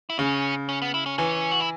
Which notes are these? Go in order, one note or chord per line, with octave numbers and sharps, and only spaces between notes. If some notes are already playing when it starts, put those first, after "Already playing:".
E4
C#3 C#4
C#4
B3
E4
C#4
E3 C#4
F#4
E4